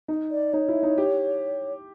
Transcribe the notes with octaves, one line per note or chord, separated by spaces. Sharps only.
D#4
D5
D#4 C#5
E4
D#4
G4